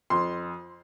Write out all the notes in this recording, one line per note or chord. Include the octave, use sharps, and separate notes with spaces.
F2 C6